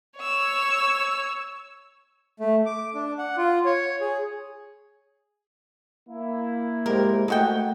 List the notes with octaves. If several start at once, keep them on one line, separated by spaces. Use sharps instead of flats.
C#5 E6
A3
D6
D4
F#5
F4
C#5
G#4
A#3 E4
G#3 G4 A#4 C5
G#3 A3 F#4 F#5 G5